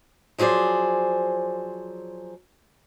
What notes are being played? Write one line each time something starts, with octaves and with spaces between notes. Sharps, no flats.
F3 F#3 G#4 C5 D5